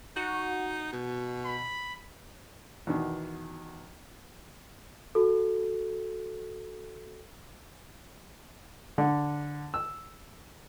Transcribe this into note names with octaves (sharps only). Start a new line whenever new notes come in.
D#4 F#4
B2
B5
E2 B2 D#3
F#4 A4
D3
E6